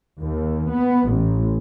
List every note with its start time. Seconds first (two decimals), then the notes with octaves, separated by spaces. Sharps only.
0.20 D#2
0.71 B3
1.11 A1